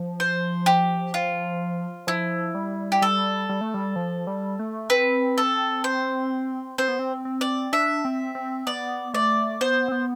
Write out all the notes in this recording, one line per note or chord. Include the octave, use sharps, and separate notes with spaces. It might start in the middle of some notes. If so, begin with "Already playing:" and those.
Already playing: F3
C5
G4
F4
F3 E4
G3
G4
G3 A4
G3
A3
G3
F3
G3
A3
C4 B4
A4
C5
C4 C5
B3
C4
C4
D5
D4 E5
C4
C4
B3 D5
A3 D5
B3 C5
C4
B3